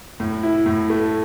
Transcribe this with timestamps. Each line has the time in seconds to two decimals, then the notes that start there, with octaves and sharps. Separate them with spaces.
0.20 A2
0.43 E4
0.66 A2
0.90 A3